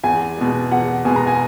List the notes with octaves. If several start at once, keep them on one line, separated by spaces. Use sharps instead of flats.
E2 G#5
B2 G#3
E2 F#5
B2 G#3 G#5
A#5
G#5